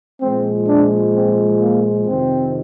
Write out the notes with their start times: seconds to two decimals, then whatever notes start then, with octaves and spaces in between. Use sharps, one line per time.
0.22 A#2 F3 G#3 C4
0.68 D4
1.14 C4
1.60 A#3
2.07 F2 C3 D#3 C4